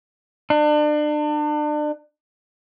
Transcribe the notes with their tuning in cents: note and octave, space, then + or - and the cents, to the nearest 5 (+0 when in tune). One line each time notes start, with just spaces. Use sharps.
D4 +35